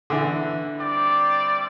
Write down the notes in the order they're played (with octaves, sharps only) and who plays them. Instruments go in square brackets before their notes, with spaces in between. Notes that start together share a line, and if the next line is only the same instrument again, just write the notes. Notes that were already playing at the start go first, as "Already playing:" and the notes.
[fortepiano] D3 E3
[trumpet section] G3 C4 D5